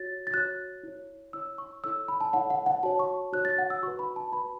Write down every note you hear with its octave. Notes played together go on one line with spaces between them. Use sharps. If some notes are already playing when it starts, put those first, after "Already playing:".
Already playing: F#4 C#5 A6
A6
F#4 C#5 F#6
E4 C#5
E4 C#5 E6
C#6
E4 A4 C#5 E6
B5
A5
E4 A4 C#5 F#5
F#5
F#5
F#4 C#5 A5
C#6
F#4 C#5 F#6
A6
F#5
E6
F#4 B4 C#6
B5
A5
F#4 B4 B5